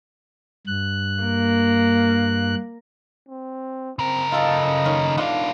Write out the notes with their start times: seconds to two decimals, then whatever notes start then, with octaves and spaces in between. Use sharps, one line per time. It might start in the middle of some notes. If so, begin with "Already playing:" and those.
0.67 G2 F#6
1.23 A#3
3.29 C4
3.99 C#3 C4 A#4
4.32 F4 A4 D#5 A5
4.85 D#3 C#4
5.18 B3 D4 F4 F5